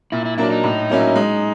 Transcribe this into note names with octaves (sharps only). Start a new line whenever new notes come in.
A#2 E4
E4
F#3 A#3 D4 E4
D#4
A2
F#3 A#3 C#4 E4
G#3